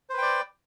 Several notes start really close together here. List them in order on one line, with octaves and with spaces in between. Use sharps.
C5 B4 G5 D5